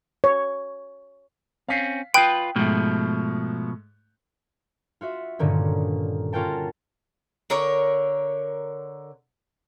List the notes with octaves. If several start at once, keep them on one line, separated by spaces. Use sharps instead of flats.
C#5
C4 C#4 F5 B6 C7
F4 B4 G5 D#6 F#6 G6
G#2 B2 F3 A3
F4 F#4 E5
G2 A#2 D3 D#3 C#4
C#4 F4 F#4 A#4 G5 A5
D3 A#4 C#5